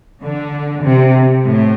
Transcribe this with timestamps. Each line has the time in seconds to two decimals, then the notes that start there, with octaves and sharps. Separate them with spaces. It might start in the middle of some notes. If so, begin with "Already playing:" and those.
0.22 D3
0.83 C3
1.45 A2